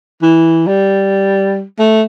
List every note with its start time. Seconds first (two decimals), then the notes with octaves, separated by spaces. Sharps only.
0.22 E3
0.67 G3
1.79 A3